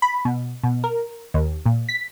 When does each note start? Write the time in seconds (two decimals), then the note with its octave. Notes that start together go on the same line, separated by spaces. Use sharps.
0.02 B5
0.25 B2
0.63 B2
0.84 A#4
1.34 D#2
1.66 A#2
1.89 B6